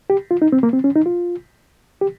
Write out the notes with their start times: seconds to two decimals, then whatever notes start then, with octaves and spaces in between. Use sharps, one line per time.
0.10 G4
0.31 F4
0.42 D#4
0.52 C4
0.63 A#3
0.73 C4
0.84 C#4
0.96 D#4
1.06 F4
2.01 G4